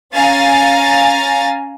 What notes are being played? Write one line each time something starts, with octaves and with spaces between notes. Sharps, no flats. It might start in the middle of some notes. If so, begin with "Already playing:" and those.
C#4 F5 G#5 A#5 A6